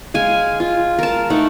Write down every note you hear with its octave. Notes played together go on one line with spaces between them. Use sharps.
G#3 F5 G#5
F4
A#4 A5
A3 D#4 F#5